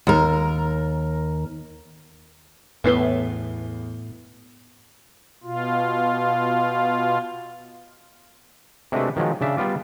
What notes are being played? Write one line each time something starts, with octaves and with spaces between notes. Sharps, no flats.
D#2 A#4
E2 A2 B3 E4 B4 C7 G7
B2 F4
C3 G#3 A3 D4 F#4 B4
D#3 F3 F#3 G#3
C#3 D4 E5
G3 B3 F4 D5